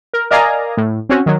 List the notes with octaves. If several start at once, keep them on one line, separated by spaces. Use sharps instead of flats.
A#4
A#4 D5 D#5 F5 G#5 A#5
A2
C4 C#4 F#4
D#3 F#3